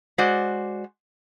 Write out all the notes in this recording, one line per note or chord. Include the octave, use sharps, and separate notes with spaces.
G#3 F#4 C5 D5